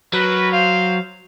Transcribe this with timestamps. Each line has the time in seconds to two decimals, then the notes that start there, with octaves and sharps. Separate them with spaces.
0.13 F#3 F#4 A#4 B4
0.53 C5 F5